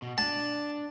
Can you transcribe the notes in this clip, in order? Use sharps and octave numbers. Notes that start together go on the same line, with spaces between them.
B2
D4 A5